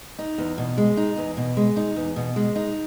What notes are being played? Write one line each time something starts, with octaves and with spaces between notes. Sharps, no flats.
D#4
E2
B2
G#3
D#4
E2
B2
G#3
D#4
E2
B2
G#3
D#4